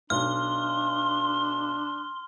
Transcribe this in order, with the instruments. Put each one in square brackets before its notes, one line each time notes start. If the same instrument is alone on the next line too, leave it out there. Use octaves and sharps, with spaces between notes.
[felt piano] B1 [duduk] D4 [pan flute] C6 [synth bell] F6